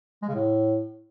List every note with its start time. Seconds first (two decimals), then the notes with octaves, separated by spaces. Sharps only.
0.23 G#3
0.28 C#3
0.34 A2